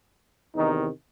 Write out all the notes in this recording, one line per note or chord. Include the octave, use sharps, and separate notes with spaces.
E2 C3 D#3 D#4